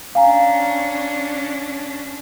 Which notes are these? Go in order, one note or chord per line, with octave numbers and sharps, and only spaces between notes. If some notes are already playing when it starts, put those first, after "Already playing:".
C#4 D4 F5 G#5 A#5